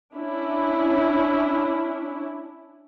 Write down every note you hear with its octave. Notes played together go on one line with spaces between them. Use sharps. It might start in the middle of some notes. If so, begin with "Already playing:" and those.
C#4 D4 E4